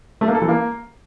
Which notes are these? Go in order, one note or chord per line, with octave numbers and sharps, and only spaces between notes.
A3
A#3
A4
E3
A#3